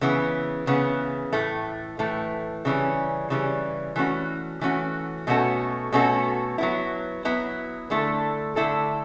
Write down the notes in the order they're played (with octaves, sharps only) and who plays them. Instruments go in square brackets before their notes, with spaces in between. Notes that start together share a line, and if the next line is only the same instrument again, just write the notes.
[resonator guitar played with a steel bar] C#3 E3 B3
C#3 E3 B3
A2 E3 A3
A2 E3 A3
C#3 E3 G3 C#4
C#3 E3 G3 C#4
E3 A3 C#4 F#4
E3 A3 C#4 F#4
B2 A3 C#4 F#4 A4
B2 A3 C#4 F#4 A4
F#3 B3 E4
F#3 B3 E4
D3 A3 E4 A4
D3 A3 E4 A4